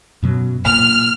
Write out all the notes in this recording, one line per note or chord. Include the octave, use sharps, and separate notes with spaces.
F#2 B2 F#3
A#2 F6